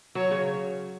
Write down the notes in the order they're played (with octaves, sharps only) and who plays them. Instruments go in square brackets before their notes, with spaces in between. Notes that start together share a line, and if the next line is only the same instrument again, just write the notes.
[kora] F#3 [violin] C#5
[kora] C#3